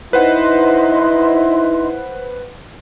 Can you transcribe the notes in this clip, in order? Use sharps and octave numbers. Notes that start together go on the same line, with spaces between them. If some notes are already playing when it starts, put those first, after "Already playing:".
D#4 E4 B4 C5 D#5 F#5 C6